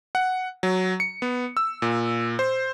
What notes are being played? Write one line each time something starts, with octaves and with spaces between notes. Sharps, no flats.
F#5
F#3
C#7
B3
E6
A#2
C5